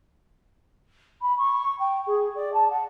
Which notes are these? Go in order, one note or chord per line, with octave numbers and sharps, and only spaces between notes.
B5
C#6
G5
G#4
D5
A5
F#5